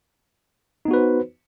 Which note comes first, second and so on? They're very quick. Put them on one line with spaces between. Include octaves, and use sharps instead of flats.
D#4 B3 F#4 B4 C5